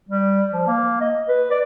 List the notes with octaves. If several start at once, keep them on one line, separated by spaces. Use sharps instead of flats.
G3
F3
A#3
D#5
B4
D5